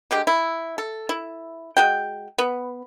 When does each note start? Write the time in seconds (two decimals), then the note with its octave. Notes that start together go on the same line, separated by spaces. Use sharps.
0.11 D3 G#3 G4
0.27 E4
0.78 A4
1.09 E4
1.77 G#3 F#4 G5
2.38 B3